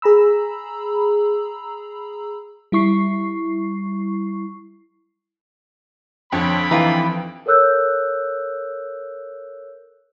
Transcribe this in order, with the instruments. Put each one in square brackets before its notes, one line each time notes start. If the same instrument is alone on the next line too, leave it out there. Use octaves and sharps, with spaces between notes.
[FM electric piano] G#4 A#5 B5 E6
G3 E4 C#6 C7
[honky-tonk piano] F2 [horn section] D3 B5 [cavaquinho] C#5 C6
[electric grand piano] E3 [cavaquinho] D#4 F4 G4
[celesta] A4 A#4 C#5 E6 F#6 G6